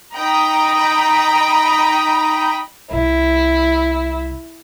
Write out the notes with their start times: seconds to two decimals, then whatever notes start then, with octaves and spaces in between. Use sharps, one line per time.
0.14 D#4 D#5 G5 A#5 B5
2.91 C2 C3 E4